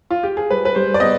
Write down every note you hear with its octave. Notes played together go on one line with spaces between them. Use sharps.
F4
G4
G#4
G3 B4
B4
G3 C5
D5
B3 D#5